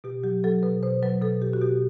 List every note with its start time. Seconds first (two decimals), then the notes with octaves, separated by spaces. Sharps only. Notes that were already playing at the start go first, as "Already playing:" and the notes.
0.04 B2 G4
0.23 F#3 G4
0.44 F#3 A4
0.63 B2 B4
0.83 B2 C5
1.03 F#3 B4
1.21 B2 A4
1.42 B2 G4
1.53 F#4
1.61 B2 G4